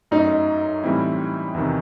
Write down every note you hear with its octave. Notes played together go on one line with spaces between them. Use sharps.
F#2 F#3 A3 D#4
A2 E3 G3 C4 E4
E2 C3 D#3